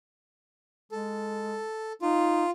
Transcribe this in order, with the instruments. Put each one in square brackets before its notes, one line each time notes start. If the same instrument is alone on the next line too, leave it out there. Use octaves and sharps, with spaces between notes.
[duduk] G#3 [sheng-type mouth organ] A4
[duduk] D#4 [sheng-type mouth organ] F4